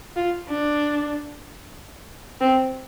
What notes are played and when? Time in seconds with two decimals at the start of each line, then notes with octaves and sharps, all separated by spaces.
0.16 F4
0.49 D4
2.41 C4